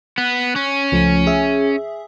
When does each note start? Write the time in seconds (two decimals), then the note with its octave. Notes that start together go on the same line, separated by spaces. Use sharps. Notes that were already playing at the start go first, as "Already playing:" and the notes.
0.18 B3 F#6
0.56 C#4
0.92 C#2 F3 A3
1.27 G#4 E5